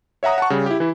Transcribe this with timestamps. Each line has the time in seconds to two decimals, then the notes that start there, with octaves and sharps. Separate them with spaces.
0.23 C#5 E5 F#5 A#5 D#6
0.38 F#5 A5 C#6
0.50 C#3 G3
0.66 E4 G4
0.80 E3 E4